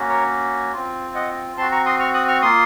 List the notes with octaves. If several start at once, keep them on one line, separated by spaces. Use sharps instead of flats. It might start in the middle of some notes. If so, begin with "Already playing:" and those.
Already playing: A#3 C#4 F#4
A#4 C#5
C4 F4
D#5 F#5
C4 F#4 A5 C6
A#5 C#6
C6 D#6
C#6 F6
D#6 F#6
C#6 F6
A#3 F4 C6 D#6